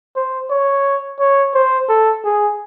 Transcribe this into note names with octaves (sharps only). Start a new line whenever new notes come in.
C5
C#5
C#5
C5
A4
G#4